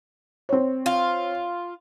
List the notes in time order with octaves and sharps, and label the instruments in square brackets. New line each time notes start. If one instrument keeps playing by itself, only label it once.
[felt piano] C4 C#5
[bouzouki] F4